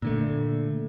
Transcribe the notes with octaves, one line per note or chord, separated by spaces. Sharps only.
A#2 D3 A3